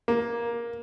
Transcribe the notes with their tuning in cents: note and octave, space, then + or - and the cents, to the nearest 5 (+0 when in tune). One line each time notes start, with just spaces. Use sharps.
A#3 +10